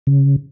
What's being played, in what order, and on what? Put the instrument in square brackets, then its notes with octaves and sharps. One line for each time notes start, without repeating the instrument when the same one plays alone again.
[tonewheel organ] C#3